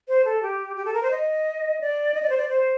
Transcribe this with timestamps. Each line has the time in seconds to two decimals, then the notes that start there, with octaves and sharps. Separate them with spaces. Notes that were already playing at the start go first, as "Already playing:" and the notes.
0.08 C5
0.25 A4
0.43 G4
0.76 G4
0.85 A4
0.94 A#4
1.03 C5
1.11 D#5
1.81 D5
2.14 D#5
2.23 D5
2.30 C5
2.38 D5
2.49 C5